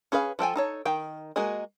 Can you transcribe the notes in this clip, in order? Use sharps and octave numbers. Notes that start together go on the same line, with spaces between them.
C#4 G#4 B4 F5
F3 A4 G5 G#5
D#4 A4 C#5
D#3 G5
G#3 A#3 F#4 G#4 D#5